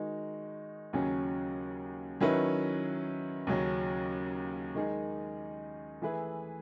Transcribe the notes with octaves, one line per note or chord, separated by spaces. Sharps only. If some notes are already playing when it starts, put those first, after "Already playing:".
Already playing: D#3 G#3 D#4 F#4
D#2 C#3 F#3 C#4 G#4
D#3 F#3 C#4 E4 B4
D#2 C#3 F#3 C#4
D#3 G#3 D#4 G#4
E3 A3 E4 G#4 B4